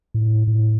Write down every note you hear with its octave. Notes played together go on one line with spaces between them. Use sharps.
A2
A2